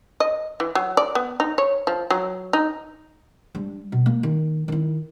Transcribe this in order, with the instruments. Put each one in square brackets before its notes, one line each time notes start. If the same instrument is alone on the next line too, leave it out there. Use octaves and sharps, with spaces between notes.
[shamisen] D#5
E3
F#3
D5
B3
D#4
C#5
F3
F#3
D#4
[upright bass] G3 D4
B2
A#3
D#3
D#3 E4